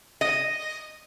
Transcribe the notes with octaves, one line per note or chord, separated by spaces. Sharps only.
D#5